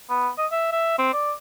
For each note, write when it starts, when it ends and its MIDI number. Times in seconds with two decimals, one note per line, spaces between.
0.10 0.29 59
0.38 0.46 75
0.52 0.67 76
0.72 0.97 76
0.99 1.13 60
1.13 1.32 74